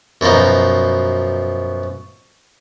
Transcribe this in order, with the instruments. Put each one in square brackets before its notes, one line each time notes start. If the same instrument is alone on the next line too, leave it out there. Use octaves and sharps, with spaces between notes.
[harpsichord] F#2 B2 F3 D#4